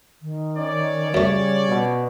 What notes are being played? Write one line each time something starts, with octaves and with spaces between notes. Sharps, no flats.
D#3
C#4 C#5 D5
F#2 C#3 G3 A3
B2